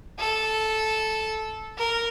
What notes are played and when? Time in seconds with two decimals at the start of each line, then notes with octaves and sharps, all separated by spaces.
0.19 A4
1.78 A#4